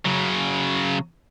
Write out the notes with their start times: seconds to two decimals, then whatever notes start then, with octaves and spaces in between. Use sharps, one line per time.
0.05 C#3 F#3